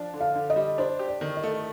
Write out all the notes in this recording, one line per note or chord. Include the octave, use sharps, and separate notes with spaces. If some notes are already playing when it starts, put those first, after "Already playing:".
Already playing: F3 D4
D3
F5
D3
D#5
G3
D4 C5
G4
D5
D#3
D#5
A3